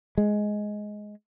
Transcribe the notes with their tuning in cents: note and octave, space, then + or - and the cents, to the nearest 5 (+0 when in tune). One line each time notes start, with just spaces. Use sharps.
G#3 +10